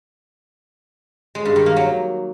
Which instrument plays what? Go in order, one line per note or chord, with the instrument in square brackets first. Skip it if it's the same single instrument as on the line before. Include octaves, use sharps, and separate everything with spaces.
[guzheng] G#3
G2
D#3
A#3
F#3